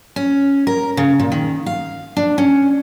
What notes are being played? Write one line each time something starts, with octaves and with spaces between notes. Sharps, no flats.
C#4
A#4
C#3
A#2
D#3
F5
D4
C#4